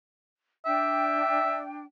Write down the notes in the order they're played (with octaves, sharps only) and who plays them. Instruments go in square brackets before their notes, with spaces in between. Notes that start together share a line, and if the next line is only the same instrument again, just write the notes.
[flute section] D4 G5 [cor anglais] E5